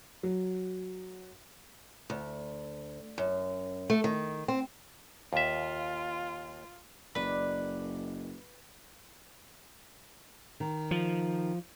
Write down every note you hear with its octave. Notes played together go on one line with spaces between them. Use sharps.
F#3
D2
F#2
A3
D#3
C4
D#2 F4 E5
F#1 D#3 B4 D5
D#3
F3